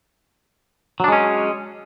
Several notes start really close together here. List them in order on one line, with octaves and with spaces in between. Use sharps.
F#3 D4 G#3 C#4